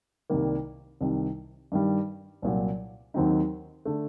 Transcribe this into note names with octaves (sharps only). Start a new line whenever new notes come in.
C2 C3 D#3 G3 A#3
C2 C3 D#3
G2 D#3 G3
C2 A#2 F#3
D#2 D#3 F#3 C4 D#4
D3 A3